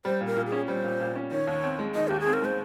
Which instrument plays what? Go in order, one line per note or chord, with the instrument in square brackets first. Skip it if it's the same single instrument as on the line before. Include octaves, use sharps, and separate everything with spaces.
[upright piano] G3 [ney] C5
[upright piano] A#2
[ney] A#4
[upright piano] A#2
[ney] G#4
[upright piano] C#4
[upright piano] G3 [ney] C5
[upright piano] A#2
A#2
C#4
[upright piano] D#3 [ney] C#5
[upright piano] D#2
C4
G#3
[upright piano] D#3 [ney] D#5
[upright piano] D#2 [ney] G4
[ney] G#4
[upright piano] C4
[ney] A#4
[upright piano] G#3 [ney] C5